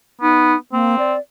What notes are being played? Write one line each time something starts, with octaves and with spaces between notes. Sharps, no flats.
B3 D#4
A#3 C4
D5